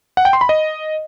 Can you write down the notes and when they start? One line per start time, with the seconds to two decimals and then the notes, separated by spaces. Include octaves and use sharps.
0.17 F#5
0.25 G5
0.33 C6
0.41 B5
0.49 D#5